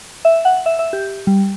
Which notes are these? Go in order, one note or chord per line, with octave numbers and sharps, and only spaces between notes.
E5
F#5
E5
E5
G4
G3